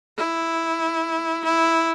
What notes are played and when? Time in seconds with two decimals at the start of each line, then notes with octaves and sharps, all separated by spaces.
0.18 E4
1.44 E4